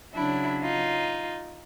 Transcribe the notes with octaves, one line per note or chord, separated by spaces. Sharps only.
C#3 F#3 D4 E4
D#4 F4